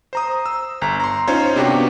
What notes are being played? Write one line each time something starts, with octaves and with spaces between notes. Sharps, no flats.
C5 A#5 D#6
E6
G1 A#5
A#5 C6
C#4 D#4 F4 C5 C#5
C3 B3 D4 F#4 G4